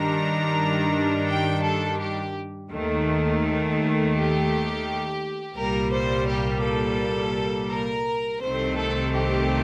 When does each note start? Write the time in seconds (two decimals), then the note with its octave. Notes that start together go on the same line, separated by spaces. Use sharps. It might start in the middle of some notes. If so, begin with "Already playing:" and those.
Already playing: G2 D#3 G3 D4 A#5
1.28 G5
1.64 A4
1.99 G4
2.70 D#2 D#3 A3
4.13 G4
5.56 C2 A#2 G3 A#3 A#4
5.91 C5
6.27 G4
6.63 A4
7.69 A#4
8.40 C2 C3 D#3 A3 C4 C5
8.76 A4
9.12 G4